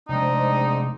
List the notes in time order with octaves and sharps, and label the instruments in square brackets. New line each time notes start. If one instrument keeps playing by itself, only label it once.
[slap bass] F1 G#3 [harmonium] G#2 C4 D4 [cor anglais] D#4